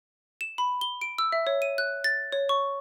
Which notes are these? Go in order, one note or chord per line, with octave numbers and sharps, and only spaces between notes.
E7
B5
G7
D7
E6
E5
C#5
D#7
F#6
A6
C#5
C#6